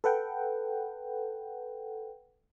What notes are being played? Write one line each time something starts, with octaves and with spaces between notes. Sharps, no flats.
A4 B4 F#5 G5